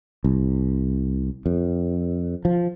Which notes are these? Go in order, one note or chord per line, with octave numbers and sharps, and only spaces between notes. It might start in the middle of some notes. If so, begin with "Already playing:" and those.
C2
F2
F3